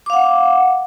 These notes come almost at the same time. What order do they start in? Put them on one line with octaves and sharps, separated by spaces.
D6 F5 F#5